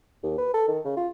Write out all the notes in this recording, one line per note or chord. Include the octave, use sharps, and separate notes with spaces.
D#2
B4
A4
D#3
C#3
F4